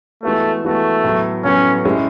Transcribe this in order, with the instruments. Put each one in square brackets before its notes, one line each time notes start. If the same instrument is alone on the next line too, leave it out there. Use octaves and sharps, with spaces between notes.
[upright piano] E3 G#3 B3 F#4 B4 [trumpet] A3
[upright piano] E3 G#3 B3 F#4 B4 [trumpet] A3
[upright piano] A2 F#3 B3
[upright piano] A2 F#3 B3 [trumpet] C#4
[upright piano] A2 G#3 C#4 E4